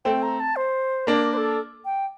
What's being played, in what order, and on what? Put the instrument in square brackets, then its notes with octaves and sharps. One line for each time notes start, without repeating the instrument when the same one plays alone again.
[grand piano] A3 C4 [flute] G5
[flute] A#5
A5
C5
[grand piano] A#3 D4 [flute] A#4
[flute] C5
A4
G5